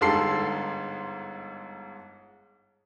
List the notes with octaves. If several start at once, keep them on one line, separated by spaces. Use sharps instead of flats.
G1 G#2 G#4 A4 C6 C7